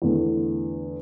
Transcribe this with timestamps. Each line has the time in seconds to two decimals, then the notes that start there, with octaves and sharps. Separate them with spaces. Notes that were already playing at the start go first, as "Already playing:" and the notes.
0.02 E2 D3 A3